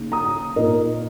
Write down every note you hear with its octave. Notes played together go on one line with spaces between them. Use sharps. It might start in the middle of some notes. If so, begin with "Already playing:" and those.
Already playing: C#3 A#3 D#4
A#5 D#6
A#2 A#3 D#4 A#4 D#5